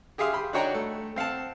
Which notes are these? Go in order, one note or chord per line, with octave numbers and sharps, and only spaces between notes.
G4 G#4 E5 F5 C6 D#6
G4 B5 C6
D4 D#4 F#4 C#5 G5 A#5
A3
C4 F5 F#5 A5